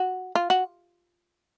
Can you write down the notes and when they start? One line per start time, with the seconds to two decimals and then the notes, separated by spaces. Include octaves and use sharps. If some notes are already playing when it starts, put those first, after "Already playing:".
Already playing: F#4
0.35 F4
0.50 F#4